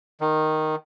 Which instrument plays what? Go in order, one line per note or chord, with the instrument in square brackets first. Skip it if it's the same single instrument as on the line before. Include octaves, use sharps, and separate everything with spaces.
[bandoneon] D#3